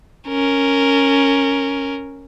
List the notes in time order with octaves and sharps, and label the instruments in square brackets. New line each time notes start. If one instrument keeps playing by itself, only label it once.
[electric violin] C#4 A#4